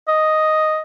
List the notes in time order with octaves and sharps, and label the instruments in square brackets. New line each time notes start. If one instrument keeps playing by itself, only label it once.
[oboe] D#5